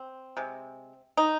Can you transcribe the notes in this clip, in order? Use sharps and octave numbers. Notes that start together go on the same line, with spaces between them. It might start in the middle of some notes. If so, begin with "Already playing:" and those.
Already playing: C4
C3 G#3
D#4